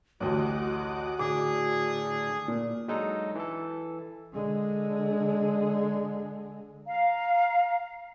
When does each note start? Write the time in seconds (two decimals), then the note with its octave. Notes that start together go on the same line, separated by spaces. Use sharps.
0.20 A1 D2 F#4 D#5 F#5 D6
1.19 A2 D3 G#4 D6
2.48 A#2
2.88 F#3 G#3 D4 D#4 A4
3.35 E3 A4
4.33 D3 G#3
6.86 F5 A#5